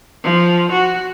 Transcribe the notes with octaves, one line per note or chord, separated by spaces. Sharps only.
F3
F#4